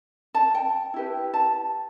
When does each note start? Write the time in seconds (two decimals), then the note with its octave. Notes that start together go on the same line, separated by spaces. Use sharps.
0.34 A5
0.55 G5
0.94 E4 G4 B4
1.34 A5